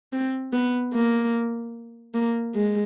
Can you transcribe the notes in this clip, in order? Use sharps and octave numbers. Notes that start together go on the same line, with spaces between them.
C4
B3
A#3
A#3
G#3